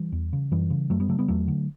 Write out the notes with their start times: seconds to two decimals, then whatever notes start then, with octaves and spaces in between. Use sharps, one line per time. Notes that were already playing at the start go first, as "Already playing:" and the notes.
Already playing: E3 G3
0.12 E2
0.33 C#3
0.51 F#2 E3 G3
0.70 C#3
0.90 F#2 F#3 A3
1.00 G3 B3
1.09 C#3 F#3 A3
1.19 G3 B3
1.28 E2 F#3 A3
1.48 D3